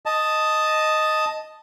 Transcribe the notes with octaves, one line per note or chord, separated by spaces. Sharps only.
D#5 A5